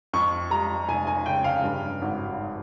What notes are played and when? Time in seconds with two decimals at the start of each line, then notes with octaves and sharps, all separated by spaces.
0.13 F2 C#6
0.50 G3 A#5
0.89 F1 G#5
1.07 G#5
1.26 C#3 G5
1.44 F5
1.64 G2
2.02 G#1